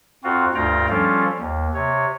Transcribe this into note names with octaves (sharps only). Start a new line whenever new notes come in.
F2 C4 F4 F#4
D2 G2 F4 G5 A#5
F3 G3 C#4 F4 A4
D#2
C3 C#5